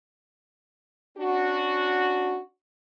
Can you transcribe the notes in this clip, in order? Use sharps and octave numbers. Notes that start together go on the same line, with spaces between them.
C#4 D4 F#4